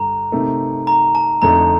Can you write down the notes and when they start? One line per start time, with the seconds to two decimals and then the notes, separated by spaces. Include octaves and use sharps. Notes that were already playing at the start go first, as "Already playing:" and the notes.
Already playing: G2 D3 A#5
0.32 C3 D#3 A3 D#4
0.87 A#5
1.15 A5
1.42 F2 D3 A3 D#4 A#5